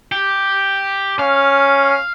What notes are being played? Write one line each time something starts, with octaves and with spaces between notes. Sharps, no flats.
G4
C#4 F5